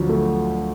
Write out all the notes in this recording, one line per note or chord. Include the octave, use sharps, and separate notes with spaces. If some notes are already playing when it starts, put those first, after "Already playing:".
Already playing: D2 F3 F#3
A3